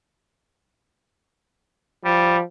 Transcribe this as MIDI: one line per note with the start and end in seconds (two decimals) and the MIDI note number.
2.05 2.43 53
2.05 2.37 55